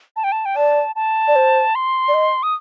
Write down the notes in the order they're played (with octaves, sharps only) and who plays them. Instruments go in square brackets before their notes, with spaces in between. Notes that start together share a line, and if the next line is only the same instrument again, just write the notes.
[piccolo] A5
G5
A5
G5
[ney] D5 [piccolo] A5
[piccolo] A5
[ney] D5
C5
[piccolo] C6
[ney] D5
D#5
[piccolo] D#6